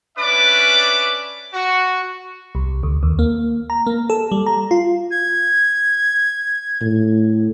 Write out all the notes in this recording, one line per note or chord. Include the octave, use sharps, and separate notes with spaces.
C#4 D4 B4 D5 E5 D6
F#4
C2
D2
D#2
A#3
A#5
A#3
A4
G3
A#5
F4
G#6
A2